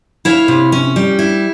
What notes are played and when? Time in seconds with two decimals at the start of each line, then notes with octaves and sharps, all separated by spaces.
0.25 E4 C#5 F5
0.48 C3
0.72 C#4
0.96 G3
1.19 E4